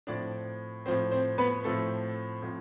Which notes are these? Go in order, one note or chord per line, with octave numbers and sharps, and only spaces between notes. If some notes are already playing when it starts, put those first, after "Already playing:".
A2 F3 C4 D4 D5
A2 F3 C4 C5
C4 C5
B3 B4
A2 F3 A3 C4 A4
A2 F3 C4